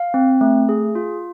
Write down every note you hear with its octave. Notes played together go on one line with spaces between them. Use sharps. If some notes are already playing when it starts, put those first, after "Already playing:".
Already playing: F5
C4
A3
G#4
F4